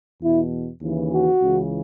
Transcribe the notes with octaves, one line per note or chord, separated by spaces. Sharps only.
E2 B2 E4
D#2 C#3 E3
F#4
C#2 C#3 E3